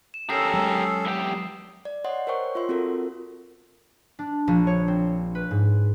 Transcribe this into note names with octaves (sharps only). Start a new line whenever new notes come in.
E7
C#4 G4 A4 A#4 D#6 E6 C7
F#3 G#3
E2 G4
D5
C#5 D#5 F#5 C6
A#4 C5 C#5 G5 C#6
F4 E5 C6
C4 F4 F#4 A4 A#4
D4
A#1
C#5
C4
B4
G#2